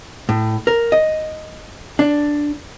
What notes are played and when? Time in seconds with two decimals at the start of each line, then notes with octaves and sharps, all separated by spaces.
0.29 A2
0.67 A#4
0.92 D#5
1.99 D4